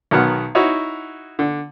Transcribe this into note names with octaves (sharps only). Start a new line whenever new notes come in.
B1 D#3 F#3 B3 F#5 F6
D#4 E4 F#4 C#5
D3